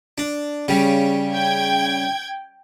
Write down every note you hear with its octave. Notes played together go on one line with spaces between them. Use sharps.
D4
C#3 G3
G5 G#6